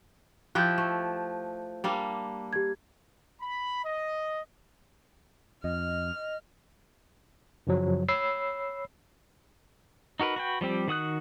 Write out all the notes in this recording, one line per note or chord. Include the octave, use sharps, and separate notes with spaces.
F3 E4 G4 F#6 G6
A3
G3 A#3 D4
G4 G#6
B5
D#5
F2 D#5 F6
F#2 C#3 F3 F#3
C#5 B5 E6 C7
D#4 F#4 A#4 B4
F#4 B4 G5
F3 G3 C4 G4
D#3 F#4 D#6 F#6